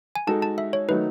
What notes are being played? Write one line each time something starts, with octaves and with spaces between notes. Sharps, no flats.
G#5
G#3 D#4 F#4 A4 A5
A5
E5
C#5
D#3 F#3 A3 D#4 B4